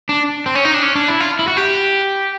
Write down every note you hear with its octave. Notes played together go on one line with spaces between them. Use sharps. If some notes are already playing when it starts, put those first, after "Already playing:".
D4
C4
C#4
D#4
D4
C#4
D4
E4
F4
E4
F#4
G4